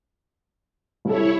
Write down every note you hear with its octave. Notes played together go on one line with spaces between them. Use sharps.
C2 E4 A4 C#5